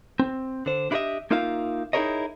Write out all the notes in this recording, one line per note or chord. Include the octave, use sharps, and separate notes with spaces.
C4
D3 C5
D4 E4 G4 B4 D#5 E5
A#3 D#4 F4 A#4 E5 F5
D#4 E4 G#4 A#4 C#5 D#5